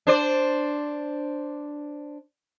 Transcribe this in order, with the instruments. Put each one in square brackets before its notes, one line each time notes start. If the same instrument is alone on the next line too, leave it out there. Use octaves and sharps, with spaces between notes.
[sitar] D4 C5 D5